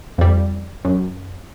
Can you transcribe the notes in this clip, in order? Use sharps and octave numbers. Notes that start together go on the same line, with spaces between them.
F2 G3
F#2